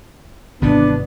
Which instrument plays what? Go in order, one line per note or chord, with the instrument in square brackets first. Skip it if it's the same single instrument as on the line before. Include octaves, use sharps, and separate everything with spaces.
[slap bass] G#1 C3 E3 [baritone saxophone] B3 [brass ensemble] D4